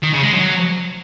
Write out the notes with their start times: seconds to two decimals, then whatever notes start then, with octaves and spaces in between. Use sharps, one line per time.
0.03 D#3
0.13 C#3
0.23 G#3
0.33 F#3